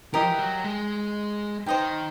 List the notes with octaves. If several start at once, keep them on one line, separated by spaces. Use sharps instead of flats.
E3 G4 A#4 D#5 G5
F3
E3
F#3
G#3
D#3 C5 D#5 G5